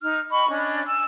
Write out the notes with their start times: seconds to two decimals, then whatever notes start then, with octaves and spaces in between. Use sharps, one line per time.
0.02 D#4 F6
0.31 D#5 G5 B5 C#6
0.49 C#4 D4 D#5
0.86 G#5 E6